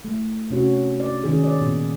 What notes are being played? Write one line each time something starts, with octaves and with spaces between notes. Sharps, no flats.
A3
C3 C#4 F#4
D5
D#3 C#4 G#4
D5
A#2 B3